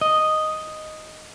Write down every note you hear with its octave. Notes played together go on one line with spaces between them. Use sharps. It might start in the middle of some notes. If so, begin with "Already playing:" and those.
D#5